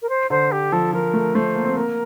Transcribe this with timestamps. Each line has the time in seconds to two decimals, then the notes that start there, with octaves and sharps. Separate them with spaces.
0.02 A#4
0.09 C5
0.30 D3 C5
0.51 G4
0.72 F3 A4
0.93 F3 A#4
1.14 A3
1.34 A3 C5
1.55 A#3
1.65 C4
1.73 A#3 A#4